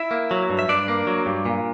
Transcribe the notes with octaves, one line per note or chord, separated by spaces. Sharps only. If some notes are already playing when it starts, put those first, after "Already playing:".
Already playing: E4 E5
A#3
F#3
G2
E5
G2 D4 D5
A#3
F#3
G2
A#2